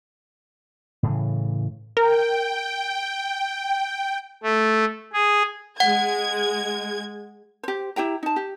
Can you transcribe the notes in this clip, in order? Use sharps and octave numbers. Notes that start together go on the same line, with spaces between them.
A2 C#3 E3
A#4 G5
A3
G#4
G#3 F#5 G#6
G4 C5
E4 G4 G5 A#5
D#4 A5
G4